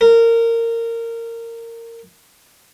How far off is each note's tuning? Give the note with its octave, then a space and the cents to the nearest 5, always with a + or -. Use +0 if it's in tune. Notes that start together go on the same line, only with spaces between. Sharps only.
A#4 -20